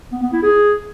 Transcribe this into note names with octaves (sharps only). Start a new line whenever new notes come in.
B3
B3
E4
G#4